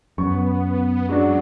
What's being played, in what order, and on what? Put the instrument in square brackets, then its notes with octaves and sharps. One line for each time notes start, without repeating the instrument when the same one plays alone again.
[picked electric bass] F#2 [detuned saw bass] B3 [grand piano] C#6
[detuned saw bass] F#3 [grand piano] G#3 D4 F#4